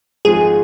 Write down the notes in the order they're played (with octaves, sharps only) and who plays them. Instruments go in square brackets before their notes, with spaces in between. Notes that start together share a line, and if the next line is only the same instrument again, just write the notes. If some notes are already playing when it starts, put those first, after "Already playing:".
[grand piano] G#1 G#2 F3 [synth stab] G#4